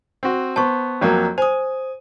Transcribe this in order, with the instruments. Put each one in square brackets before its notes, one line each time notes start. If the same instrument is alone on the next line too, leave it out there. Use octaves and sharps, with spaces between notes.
[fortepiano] C4 F#4
[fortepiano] B3 C5 [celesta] A5 C#6
[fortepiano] F2 F#3 A#3
[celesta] C5 D#6 [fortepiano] G#5